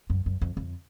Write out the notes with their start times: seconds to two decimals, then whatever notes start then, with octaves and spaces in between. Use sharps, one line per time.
0.10 F#2
0.26 F#2
0.41 F2
0.57 F2